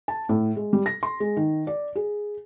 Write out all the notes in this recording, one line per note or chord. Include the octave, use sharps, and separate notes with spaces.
A5
A2
G#3
G3
A#6
C6
G#3
D#3
D5
G#4